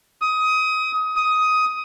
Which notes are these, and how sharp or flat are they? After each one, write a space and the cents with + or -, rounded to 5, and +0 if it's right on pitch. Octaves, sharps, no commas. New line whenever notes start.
D#6 +20
D#6 +10